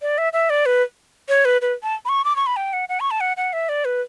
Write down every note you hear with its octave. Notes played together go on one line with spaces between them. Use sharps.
D5
E5
E5
D5
B4
C#5
B4
B4
A5
B5
C#6
D6
C#6
B5
G5
F#5
F#5
C#6
A5
F#5
F#5
E5
D5
B4